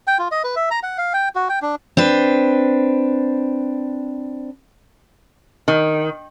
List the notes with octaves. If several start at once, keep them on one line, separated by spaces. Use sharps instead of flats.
G5
F4
D#5
B4
E5
A#5
F#5
F5
G5
F#4
G5
D4
C4 D4 B4
D#3